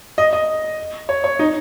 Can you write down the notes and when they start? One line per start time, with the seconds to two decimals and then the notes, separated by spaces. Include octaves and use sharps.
0.18 D#5
0.33 D#5
1.09 C#5
1.24 C#5
1.39 D#4